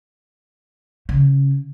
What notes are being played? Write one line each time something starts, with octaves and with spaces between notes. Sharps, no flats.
C#3